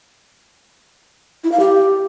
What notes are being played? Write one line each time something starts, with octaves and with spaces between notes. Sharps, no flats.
E4
F5
G4